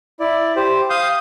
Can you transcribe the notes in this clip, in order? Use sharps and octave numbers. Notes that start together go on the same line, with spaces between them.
E4 D5
G4 C5
F5 D#6 G6